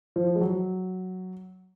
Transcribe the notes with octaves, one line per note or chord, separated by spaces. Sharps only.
F3
G#3
F#3